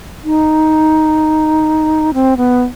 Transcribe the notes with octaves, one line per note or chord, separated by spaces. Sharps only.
D#4
C4
B3